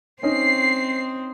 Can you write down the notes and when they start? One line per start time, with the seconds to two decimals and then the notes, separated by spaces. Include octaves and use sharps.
0.23 C4 C#4 D#4 C7